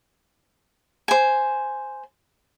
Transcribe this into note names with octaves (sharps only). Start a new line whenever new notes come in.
C5 G#5